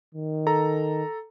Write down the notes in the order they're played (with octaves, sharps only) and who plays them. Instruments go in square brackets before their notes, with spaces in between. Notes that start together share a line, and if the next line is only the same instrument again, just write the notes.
[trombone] D#3
[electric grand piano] A4 A#5